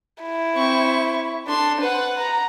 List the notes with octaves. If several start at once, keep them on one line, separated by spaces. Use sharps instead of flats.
E4
C4 C#6
D4 A4 C6
B4 C5 F#5
A#5